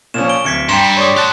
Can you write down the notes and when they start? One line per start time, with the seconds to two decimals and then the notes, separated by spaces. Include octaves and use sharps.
0.14 A#2 F3 C#4 E7
0.29 D7 G7
0.44 D1 G#6 B6 C#7 D7
0.69 G2 G3 G5 A#5 C6 C#7 E7
0.97 C#5 D5 C6 D#6
1.17 G4 A5 C6 D#6 F#6